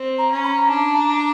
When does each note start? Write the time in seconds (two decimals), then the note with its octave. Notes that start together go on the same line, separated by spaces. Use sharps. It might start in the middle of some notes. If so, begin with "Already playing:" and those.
Already playing: C4
0.18 A#5
0.31 C#4
0.44 B5
0.47 A#5
0.69 D4 A5
0.95 A#5